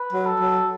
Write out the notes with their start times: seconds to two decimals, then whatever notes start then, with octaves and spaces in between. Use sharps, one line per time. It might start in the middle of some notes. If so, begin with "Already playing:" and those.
Already playing: B4
0.13 F#3
0.26 A4
0.40 F#3